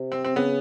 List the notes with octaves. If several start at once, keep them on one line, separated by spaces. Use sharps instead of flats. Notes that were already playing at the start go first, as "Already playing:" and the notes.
Already playing: C3
C4
C4
C#3 B3